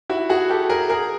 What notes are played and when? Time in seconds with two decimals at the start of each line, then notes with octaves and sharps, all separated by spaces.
0.09 E4 F#4
0.29 F#4 G#4
0.50 G4 A4
0.69 G#4 A#4
0.90 G#4 A#4